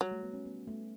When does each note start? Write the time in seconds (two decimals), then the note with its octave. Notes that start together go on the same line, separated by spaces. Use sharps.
0.01 F#3 G3
0.12 A3
0.23 B3
0.34 C#4
0.45 B3
0.68 A3